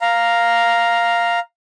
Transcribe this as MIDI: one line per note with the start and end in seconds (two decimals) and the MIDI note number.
0.01 1.39 77
0.01 1.39 82